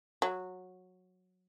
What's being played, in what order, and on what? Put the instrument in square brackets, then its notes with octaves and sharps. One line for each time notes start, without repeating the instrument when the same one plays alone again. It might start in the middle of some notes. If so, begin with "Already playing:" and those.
[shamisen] F#3